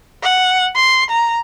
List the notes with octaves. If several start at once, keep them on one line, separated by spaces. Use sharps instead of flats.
F#5
C6
A#5